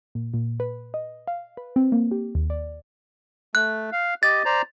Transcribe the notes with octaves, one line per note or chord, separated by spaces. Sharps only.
A#2
A#2
B4
D#5
F5
B4
C4
A#3
G4
D#2
D5
A3 F#6
F5
G4 D#5 A6
C5 D5 A#5